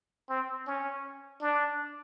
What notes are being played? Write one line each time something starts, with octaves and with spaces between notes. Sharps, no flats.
C4
C#4
D4